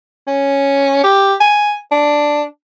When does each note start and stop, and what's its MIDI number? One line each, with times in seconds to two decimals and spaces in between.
0.28 1.01 61
1.04 1.34 67
1.41 1.76 80
1.92 2.44 62